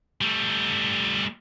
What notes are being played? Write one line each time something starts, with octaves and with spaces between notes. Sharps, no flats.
G3 A3